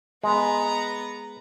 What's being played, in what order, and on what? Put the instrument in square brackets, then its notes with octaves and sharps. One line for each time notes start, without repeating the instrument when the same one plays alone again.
[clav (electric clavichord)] G#3 [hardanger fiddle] B3 A#5